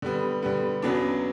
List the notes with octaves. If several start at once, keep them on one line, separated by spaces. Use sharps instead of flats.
D3 G3 B3
D3 G3 B3
E2 C#3 F#3 B3 D4